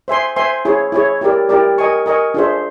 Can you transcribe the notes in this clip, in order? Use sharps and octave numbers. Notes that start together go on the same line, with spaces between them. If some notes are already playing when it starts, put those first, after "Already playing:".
C5 E5 G#5 C6
C5 E5 G#5 C6
E4 G#4 C#5
E4 G#4 C#5
E4 G4 A#4 D5
E4 G4 A#4 D5
A#4 D#5 G#5 C#6
A#4 D#5 G#5 C#6
D4 F4 G#4 C5 E5